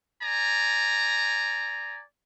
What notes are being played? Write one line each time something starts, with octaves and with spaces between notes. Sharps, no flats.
D5 G#5 A#5